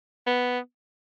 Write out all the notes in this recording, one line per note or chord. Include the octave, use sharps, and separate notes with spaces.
B3